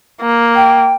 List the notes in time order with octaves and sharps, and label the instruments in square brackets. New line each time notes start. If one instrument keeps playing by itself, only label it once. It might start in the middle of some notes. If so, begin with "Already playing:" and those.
[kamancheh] A#3
[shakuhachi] G5